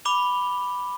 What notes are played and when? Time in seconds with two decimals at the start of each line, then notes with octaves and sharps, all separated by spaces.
0.05 B5 D6 F7 G7